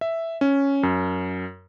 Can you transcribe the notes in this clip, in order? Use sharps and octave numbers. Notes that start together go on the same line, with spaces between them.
E5
C#4
F#2